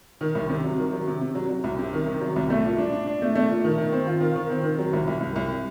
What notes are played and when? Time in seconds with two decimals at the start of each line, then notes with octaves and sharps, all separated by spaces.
0.21 D#3
0.35 C2
0.49 C3
0.64 F#3
0.78 D#3
0.93 F#3
1.08 C3
1.21 C3
1.35 F#3
1.49 F#3
1.64 C2
1.78 C3
1.93 D#3
2.07 C3
2.21 F#3
2.36 C2
2.50 A3
2.65 A#2
2.78 D4
2.92 D4
3.07 D4
3.22 A3
3.36 A3
3.50 A#2
3.64 D#3
3.78 D#3
3.92 C4
4.07 F4
4.21 D#3
4.35 D#3
4.50 C4
4.63 D#3
4.79 F#3
4.93 C2
5.07 C2
5.21 C2
5.36 C2